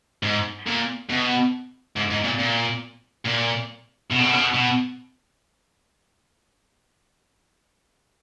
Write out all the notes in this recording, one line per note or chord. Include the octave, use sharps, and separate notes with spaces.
G#2
A#2
B2
G#2
G#2
A#2
A#2
A#2
B2
C#3
B2
C#3
B2
B2